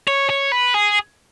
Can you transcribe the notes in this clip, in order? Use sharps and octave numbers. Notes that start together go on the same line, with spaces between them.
C#5
C#5
B4
G#4